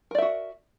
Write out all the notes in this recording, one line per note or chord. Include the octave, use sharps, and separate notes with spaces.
F#4 A#4 D5 E5